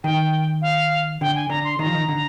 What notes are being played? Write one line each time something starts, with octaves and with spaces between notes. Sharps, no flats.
D#3 G5
F5
D3 G5
G#5
D3 A#5
C6
D#3 A#5
F3
D#3
D3